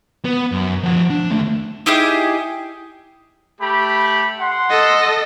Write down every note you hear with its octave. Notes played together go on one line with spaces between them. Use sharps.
B3
F#2
F3 F#5
D4
D#2 A3
D#4 E4 G4 G#4
A3 G4 B5
F#5 C6
A4 D#5